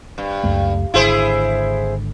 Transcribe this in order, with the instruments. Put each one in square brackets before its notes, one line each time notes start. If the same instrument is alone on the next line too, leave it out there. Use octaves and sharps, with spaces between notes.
[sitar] G2
[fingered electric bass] C#2 F#2 A3
[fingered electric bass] G#1 D3 [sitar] E4 G#4 C5